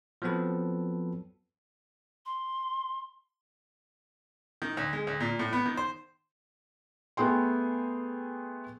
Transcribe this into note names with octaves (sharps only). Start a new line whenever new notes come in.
F3 F#3 B3 C4 A4 B4
C6
D#3
D2
G#3
D2
A#2
A2
B3
D#3
C5
A3 B3 G#4 G5 C6